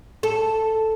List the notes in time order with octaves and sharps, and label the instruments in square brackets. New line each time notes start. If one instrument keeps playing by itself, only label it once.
[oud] A4